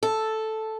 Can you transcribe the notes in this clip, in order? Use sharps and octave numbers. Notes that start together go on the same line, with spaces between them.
A4